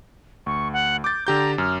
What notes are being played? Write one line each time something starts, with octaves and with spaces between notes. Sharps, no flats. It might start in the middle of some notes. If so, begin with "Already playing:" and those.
D2 C#6
F#5
D6 G6 A6
D3 G4 A#5 G6
F#2 F6